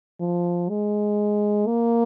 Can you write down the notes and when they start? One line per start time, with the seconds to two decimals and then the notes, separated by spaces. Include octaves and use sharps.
0.20 F3
0.69 G#3
1.67 A#3